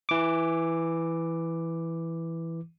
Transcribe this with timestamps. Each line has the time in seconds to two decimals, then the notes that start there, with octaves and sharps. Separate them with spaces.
0.09 E3 D6